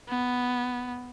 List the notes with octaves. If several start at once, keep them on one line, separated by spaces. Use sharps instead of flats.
B3